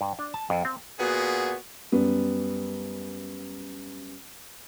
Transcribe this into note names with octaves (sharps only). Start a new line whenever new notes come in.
G2
D4
A5
F2
C4
A#2 B3 F#4 G#4
F#2 G3 B3